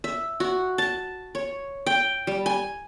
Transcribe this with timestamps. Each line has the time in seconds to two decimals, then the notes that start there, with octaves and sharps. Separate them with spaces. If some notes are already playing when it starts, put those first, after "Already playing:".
0.04 E5
0.40 F#4
0.78 A5
1.35 C#5
1.87 G5
2.27 G3
2.46 G#5